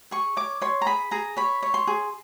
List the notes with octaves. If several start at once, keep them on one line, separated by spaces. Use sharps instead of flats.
G#4 C#6
C#5 D6
C#5 C6
A#5
G#4 B5
G#4 A#5
C#5 B5
C#5
C6
G#4